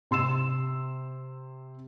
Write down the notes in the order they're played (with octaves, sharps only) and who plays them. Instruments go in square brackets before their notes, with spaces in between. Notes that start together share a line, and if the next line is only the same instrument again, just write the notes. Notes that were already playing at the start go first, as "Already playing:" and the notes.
[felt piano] C3 C6 E6 E7